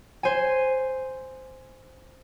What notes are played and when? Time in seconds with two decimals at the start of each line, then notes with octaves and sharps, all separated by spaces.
0.23 C5 G#5